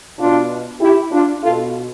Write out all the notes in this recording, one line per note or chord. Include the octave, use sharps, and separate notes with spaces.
B2 D4 F4
E4 G4
D4 F4
B2 F4 A4